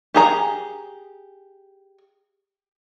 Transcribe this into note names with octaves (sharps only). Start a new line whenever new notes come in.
G4 G#4 A#5